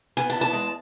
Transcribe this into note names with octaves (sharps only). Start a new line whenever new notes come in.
B3 G#5
A5
E2
A5
G#3